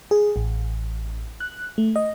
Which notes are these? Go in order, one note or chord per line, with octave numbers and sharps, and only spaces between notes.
G#4
A1
F#6
A3
D#5